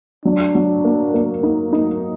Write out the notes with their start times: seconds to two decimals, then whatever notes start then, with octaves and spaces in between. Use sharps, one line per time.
0.25 F#3 D4
0.55 F#3
0.85 A#3
1.14 A#3
1.43 D#4
1.73 D#4